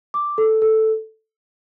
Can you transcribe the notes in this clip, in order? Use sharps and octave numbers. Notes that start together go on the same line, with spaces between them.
D6
A4
A4